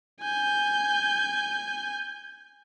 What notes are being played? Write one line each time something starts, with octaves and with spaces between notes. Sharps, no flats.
G#5 G6